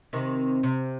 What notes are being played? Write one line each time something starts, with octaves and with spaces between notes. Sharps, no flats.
C3 D#3
C3